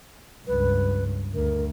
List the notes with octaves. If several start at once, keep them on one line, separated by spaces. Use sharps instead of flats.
C#2 G2 B4
D2 A#4